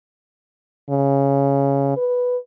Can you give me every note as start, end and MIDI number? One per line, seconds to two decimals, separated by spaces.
0.90 1.93 49
1.97 2.38 71